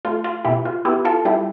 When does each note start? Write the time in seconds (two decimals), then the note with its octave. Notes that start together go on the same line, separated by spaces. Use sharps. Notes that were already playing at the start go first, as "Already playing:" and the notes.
0.05 A3 F4
0.24 F4
0.44 B2 E4 G4
0.65 F4
0.85 B3 E4 G4
1.05 F4 A4
1.25 G3 E4 G4